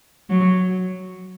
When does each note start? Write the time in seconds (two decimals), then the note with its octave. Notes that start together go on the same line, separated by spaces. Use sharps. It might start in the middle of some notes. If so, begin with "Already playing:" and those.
0.29 F#3